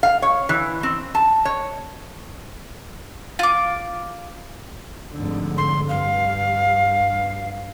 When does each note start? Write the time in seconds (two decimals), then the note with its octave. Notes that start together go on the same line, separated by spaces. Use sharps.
0.03 F5
0.22 C#5
0.49 E3
0.83 C4
1.15 A5
1.45 C#5
3.39 F4 D6
5.13 F1 G#2 D3
5.58 C6
5.89 G2 F5